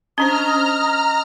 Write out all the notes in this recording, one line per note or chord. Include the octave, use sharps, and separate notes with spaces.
C#4 D4 C5 D#5 A#5 C#6 D#6 F6